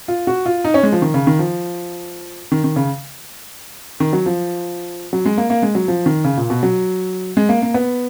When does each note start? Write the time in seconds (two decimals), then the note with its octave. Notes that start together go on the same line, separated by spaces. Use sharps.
0.08 F4
0.27 F#4
0.46 F4
0.64 D#4
0.74 C#4
0.83 G#3
0.92 F3
1.02 D#3
1.14 C#3
1.27 D#3
1.39 F3
2.52 D#3
2.64 D#3
2.76 C#3
4.00 D#3
4.13 F#3
4.26 F3
5.13 F#3
5.26 G#3
5.38 A#3
5.50 A#3
5.63 G#3
5.75 F#3
5.88 F3
6.06 D#3
6.24 C#3
6.37 A#2
6.50 B2
6.63 F#3
7.37 G#3
7.49 A#3
7.62 A#3
7.74 B3